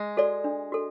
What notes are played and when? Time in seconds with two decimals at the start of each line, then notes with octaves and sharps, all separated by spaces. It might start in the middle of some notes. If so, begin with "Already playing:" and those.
Already playing: G#3
0.17 F#4 A4 D5
0.44 D4
0.72 F#4 A4